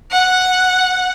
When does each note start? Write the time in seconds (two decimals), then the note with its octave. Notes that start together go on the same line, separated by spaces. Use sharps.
0.11 F#5